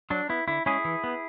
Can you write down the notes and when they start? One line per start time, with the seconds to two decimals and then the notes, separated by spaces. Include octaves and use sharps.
0.10 F#3 D4
0.29 B3 E4
0.48 D3 E4
0.66 G#3 C#4 E4 G#4
0.85 E3
1.04 B3